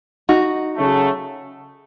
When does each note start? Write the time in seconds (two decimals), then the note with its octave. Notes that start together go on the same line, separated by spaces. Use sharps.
0.29 D#4 F#4
0.76 C#3 F#3 A3